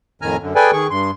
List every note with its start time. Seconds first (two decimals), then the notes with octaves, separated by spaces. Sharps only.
0.22 F2 A2 D#3 G#5 A#5 F6
0.41 F#2 D3
0.55 G#4 A4 B4 D5 G5 G#5
0.73 D#3 G#4 C#6
0.90 G2 C6